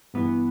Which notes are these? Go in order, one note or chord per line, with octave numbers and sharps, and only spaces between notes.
G2 E3 B3